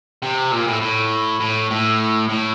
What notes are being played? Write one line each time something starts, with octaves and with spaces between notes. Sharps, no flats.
C3
A#2
A2
A2
A2
A2
A2